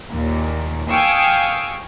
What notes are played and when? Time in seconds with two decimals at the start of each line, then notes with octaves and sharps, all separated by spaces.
0.12 D#2 A#2
0.90 F5 G5 G#5 C#6 D#6 E6